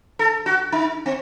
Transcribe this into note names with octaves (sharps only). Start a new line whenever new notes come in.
A4
F#4
D#4
C4